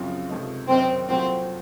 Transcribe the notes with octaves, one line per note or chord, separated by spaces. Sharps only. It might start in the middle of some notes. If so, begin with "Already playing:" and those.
Already playing: F#2 C#3 F3 C4 F4
C#2 C3 F3 A3 D#4
F#2 D#3 A#3 C4 D#4
C2 A#2 F#3 A3 C4